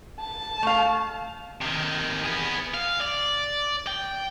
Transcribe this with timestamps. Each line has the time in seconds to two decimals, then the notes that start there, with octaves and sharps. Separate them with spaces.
0.20 A5
0.63 A3 F5
1.61 C3 D#3
2.24 B3 G#4
2.74 F5
3.01 D5
3.87 G5